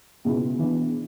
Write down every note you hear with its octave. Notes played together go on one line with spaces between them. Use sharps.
C#2 B2 G#3 B3 E4
E3 B3 D4